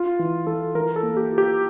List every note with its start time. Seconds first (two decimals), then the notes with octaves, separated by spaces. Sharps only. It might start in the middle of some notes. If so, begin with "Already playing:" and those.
Already playing: F4
0.19 E3
0.47 E3 A4
0.75 E3 A#4
0.96 A4
1.03 A#3
1.17 G4
1.31 F4
1.38 G4